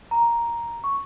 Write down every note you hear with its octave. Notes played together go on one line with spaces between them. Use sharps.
A#5
C#6